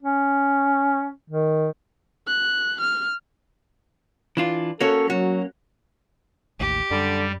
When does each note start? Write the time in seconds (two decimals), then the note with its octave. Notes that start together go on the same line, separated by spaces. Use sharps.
0.03 C#4
1.30 D#3
2.28 F#6
2.81 F6
4.37 E3 D4 F4
4.81 A#3 C#4 F#4 A4 C#5
5.10 F#3 F#4
6.60 A1 D#2 A2 G4
6.90 F#2 D3 G3